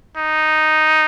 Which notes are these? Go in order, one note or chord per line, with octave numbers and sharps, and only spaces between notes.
D#4